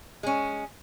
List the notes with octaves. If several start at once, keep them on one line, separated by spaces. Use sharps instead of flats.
G#3 C#4